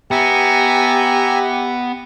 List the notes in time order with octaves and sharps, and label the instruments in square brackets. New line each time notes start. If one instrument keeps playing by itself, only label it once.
[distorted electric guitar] B3 [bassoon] G4 [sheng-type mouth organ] E5 G#5 A#5